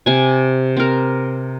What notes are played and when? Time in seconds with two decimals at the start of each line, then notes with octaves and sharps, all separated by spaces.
0.06 C3 G#5
0.77 C4 A#4